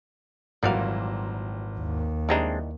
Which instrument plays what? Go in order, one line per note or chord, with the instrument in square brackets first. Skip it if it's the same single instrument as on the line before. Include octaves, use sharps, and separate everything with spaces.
[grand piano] G#1 F#3 [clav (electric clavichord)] A#2 E3 G3 [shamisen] A#3 F#4 F5
[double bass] D#2
[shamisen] E3 G3 D#4 [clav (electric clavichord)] G#3 C4 D4